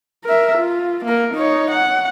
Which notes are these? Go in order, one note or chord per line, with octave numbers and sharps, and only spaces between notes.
A#4 E5
F4
A#3 A#4
D#4 C#5
F#5